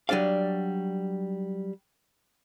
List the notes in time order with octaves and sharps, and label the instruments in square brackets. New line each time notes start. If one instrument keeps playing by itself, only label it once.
[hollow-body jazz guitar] F#3 G3 D4 D5 F5